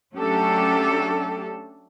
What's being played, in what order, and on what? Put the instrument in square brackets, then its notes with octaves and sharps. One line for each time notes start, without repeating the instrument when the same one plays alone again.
[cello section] F#3 A3 C#4 D4 G4 A4